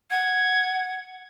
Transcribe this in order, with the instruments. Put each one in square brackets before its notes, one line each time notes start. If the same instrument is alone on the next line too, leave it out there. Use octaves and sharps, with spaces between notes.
[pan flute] F#5 [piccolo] G#6